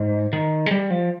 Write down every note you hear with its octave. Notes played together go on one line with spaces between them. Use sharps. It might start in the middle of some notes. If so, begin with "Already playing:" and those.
Already playing: G#2
D#3
G#3
G3
F3